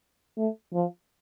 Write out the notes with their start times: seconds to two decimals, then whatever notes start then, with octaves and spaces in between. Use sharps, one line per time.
0.37 A3
0.74 F3